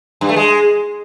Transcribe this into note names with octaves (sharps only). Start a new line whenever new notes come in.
G2
A3
G#3